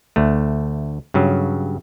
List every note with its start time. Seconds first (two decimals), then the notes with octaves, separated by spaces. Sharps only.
0.16 D2 A3
1.14 G2 C#3 F#3